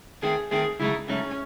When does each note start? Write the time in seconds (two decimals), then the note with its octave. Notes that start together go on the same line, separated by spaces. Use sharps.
0.22 D#3 A3 C4 G#4
0.51 D#3 A3 C4 G#4
0.79 C#2 C#3 F#3 A3 D#4 E4
1.08 C#2 C#3 F#3 A3 C#4 D#4